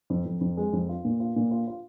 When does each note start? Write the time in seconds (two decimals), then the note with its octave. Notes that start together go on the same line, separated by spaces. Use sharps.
0.10 F2
0.26 F2
0.41 F2
0.57 G#3
0.73 F2
0.89 F4
1.05 A#2
1.20 F4
1.36 A#2
1.51 F4
1.67 F4